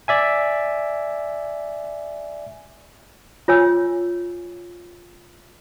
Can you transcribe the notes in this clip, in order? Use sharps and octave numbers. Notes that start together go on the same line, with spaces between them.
D5 E5 G#5
F4 C#5 G#5 E6